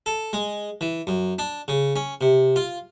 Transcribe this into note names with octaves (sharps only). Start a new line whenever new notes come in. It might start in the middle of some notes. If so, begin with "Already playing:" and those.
A4
G#3
E3
F#2
D4
C#3
C#4
C3
F4